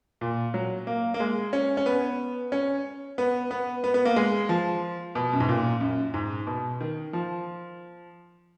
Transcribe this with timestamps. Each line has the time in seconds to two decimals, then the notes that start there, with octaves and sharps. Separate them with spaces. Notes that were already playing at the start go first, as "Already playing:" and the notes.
0.21 A#2
0.54 F#3
0.87 A#3
1.14 A#3
1.20 G#3
1.53 C#4
1.77 C#4
1.86 B3
2.52 C#4
3.18 B3
3.51 B3
3.84 B3
3.94 B3
4.05 A#3
4.16 G#3
4.49 F3
5.15 B2
5.33 F#2
5.40 G#2
5.49 A#2
5.81 F#2
6.14 G#2
6.47 B2
6.80 D#3
7.13 F3